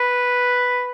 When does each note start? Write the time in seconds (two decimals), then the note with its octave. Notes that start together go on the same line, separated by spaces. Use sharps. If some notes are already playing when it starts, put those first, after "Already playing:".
Already playing: B4